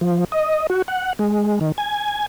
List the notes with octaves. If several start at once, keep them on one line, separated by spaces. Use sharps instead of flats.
F3
D#5
F#4
F#5
G#3
D#3
G#5